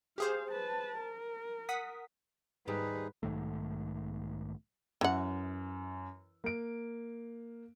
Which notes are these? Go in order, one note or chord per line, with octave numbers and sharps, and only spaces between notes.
G4 G#4 C5 F5
B4 A5
A#4
F#5 D#6 B6
D#2 G#2 G3 D#4 G#4 B4
B1 G#2 D#3 A3
F#2 E3 F#5
A#3 D7